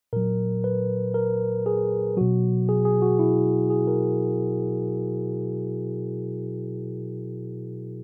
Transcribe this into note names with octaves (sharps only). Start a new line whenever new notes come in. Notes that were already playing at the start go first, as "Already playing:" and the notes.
A#2 F#3 A#4
B4
A#4
G#4
B2 F#3 F#4
G#4
G#4
F#4
E4
G#4
A#4